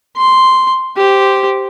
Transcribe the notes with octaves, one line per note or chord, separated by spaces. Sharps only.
C6
G4 C5